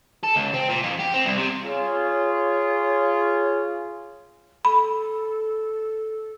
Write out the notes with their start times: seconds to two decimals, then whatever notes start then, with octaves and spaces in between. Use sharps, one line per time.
0.23 A4
0.36 C#2
0.54 C4
0.69 A#2
0.84 F2
1.00 G4
1.14 C4
1.25 C2
1.38 C3
1.65 F4 G#4 C#5
4.65 A4 B5